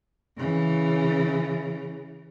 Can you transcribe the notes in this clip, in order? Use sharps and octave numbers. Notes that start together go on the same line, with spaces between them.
C#3 E3